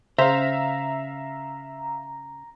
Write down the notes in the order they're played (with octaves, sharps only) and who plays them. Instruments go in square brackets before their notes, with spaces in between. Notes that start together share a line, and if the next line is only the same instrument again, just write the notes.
[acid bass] C#3 [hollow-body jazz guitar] C5 [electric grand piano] E5 F5 [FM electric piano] A#5